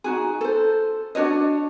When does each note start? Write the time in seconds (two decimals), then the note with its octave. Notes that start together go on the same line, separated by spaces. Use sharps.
0.04 D#4 F#4 G#4
0.41 A4 C5
1.15 D4 F#4 C#5 D#5